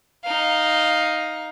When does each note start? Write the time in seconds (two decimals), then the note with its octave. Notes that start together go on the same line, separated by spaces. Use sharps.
0.24 D#4 F5